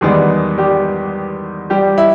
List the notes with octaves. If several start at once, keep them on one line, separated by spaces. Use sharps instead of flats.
E2 D#3 G3 G#3 B3 G#4
G3 G4
G3 G4
E4